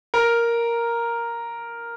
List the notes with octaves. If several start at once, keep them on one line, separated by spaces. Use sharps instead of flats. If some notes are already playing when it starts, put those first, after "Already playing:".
A#4